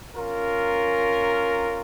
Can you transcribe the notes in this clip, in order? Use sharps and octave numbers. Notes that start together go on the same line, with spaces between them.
C#4 F4 A#4